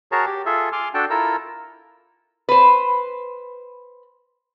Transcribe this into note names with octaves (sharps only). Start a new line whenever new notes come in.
F#4 G#4 A#4 C#5 A5 A#5
G4
F4 G#4 A4 E5
G#5 C6 D6 F6
D4 F#4 A4 G5 A5
E4 F4 A4 A#4 A#5 E6
B4 C5